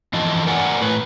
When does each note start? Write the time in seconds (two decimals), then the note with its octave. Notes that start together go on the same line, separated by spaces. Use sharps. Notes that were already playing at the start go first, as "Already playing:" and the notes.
0.13 E3 F3 F4 D#5 A5
0.47 A#4 D5 F#5 G#5
0.81 A2 B4